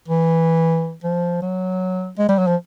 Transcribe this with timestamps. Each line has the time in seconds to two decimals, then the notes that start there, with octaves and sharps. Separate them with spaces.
0.08 E3
1.04 F3
1.42 F#3
2.18 G#3
2.29 G3
2.38 F#3
2.47 F3